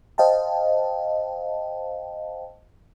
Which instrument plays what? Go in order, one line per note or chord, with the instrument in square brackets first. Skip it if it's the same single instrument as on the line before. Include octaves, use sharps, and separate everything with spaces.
[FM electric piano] C5 D#5 F5 G5 A5